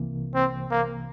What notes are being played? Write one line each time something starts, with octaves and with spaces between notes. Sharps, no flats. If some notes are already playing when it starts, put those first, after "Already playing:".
Already playing: C2 C3 E3 A#3
C4
A#3